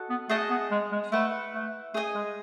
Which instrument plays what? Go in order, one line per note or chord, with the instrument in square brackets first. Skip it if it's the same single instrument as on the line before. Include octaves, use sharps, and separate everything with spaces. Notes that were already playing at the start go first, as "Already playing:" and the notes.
Already playing: [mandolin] F#4 A4 D#5 F#5
[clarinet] B3
[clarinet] A3 [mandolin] G#4 D#5 F#5 A5
[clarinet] B3
G#3
G#3
[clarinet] A3 [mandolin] E4 B4 F#5
[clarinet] A3
[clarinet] A3 [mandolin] G#4 D#5 G#5
[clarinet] G#3